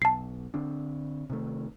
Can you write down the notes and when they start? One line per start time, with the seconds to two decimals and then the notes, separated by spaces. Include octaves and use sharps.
0.02 B1 A5 C7
0.54 D3 C4 D4
1.30 C3 D#3 A3